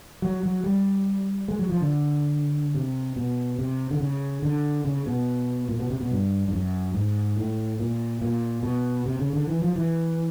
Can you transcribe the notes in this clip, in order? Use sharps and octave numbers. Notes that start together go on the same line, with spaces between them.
F#3
F#3
G3
G#3
F#3
F3
D3
C3
B2
C3
D3
C#3
D3
C#3
B2
A#2
B2
C3
B2
G2
G2
F#2
G#2
A2
A#2
A#2
B2
C3
C#3
D3
E3
F3
E3